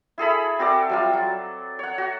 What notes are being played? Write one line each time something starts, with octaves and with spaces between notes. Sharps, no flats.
E4 G#4 A4 B5
C4 F#4 A4 D5
F#3 G3 F4
F#3
C#5 F#5
F#4